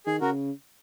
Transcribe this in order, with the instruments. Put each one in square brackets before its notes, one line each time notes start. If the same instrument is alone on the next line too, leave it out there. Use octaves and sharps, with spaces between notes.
[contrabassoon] D#3 [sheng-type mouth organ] G#4
[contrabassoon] C#3 [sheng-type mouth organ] F#4 A#4